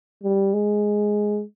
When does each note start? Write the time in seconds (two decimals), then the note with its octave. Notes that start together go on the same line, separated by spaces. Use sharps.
0.24 G3
0.54 G#3